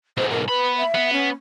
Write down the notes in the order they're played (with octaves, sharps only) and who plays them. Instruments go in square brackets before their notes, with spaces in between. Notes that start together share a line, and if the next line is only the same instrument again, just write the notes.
[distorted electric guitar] B1 G#2 [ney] C5
[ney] A#4
[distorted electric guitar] B3 B5 [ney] B4
[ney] E5
[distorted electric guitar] B3
[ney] C#4